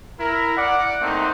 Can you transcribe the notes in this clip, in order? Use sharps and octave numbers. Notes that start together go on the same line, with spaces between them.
E4 A#4
D5 F#5
A3 A#3 C4 D#4